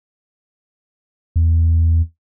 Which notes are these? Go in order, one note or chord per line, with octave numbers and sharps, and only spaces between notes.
E2